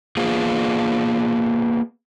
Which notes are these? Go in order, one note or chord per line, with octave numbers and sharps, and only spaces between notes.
A#3 B3 F4 G#4